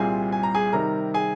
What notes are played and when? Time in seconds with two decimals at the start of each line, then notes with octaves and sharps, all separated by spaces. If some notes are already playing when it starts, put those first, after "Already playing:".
Already playing: C2 A#2 G3 C4 G#4 G#5
0.32 G#5
0.43 A#5
0.55 G#4 G#5
0.73 C3 D#3 G3 A#4 A#5
1.14 G#4 G#5